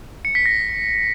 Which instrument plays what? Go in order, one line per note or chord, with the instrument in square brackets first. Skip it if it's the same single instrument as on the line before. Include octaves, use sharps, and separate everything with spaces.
[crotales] C#7
B6
A#6